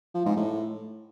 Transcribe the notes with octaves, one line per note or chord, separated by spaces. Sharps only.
F3
G#2
A2